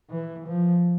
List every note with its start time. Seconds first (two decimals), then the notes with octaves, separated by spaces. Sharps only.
0.10 E3
0.47 F3